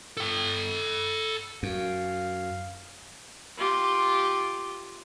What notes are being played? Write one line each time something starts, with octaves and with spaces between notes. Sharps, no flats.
A4 G5
F#2 F5
F4 G4